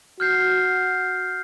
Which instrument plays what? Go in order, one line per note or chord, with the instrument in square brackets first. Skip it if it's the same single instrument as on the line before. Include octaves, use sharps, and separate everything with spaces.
[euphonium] F#4 [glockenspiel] F6 G6 C7